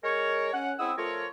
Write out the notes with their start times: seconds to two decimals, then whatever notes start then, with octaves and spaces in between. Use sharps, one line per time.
0.04 G#3 A#4 C#5
0.53 C#4 F#5
0.79 G#3 C4 E4 F#5 D#6 E6
0.98 F3 A3 F4 A#4 C#5